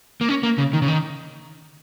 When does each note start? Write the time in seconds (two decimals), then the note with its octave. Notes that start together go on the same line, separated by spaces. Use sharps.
0.21 A#3
0.29 C#4
0.43 A#3
0.58 C#3
0.73 D#3
0.82 C#3
0.88 D#3